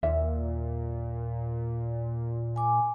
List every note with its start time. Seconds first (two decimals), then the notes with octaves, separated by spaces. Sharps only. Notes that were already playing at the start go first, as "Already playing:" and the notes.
0.03 D#2 A#2 E5
2.56 G#5 D6